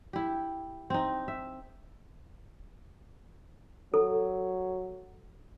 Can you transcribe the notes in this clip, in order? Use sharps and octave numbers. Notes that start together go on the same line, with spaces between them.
E4 G4
C4 D#4
E5
F#3 A4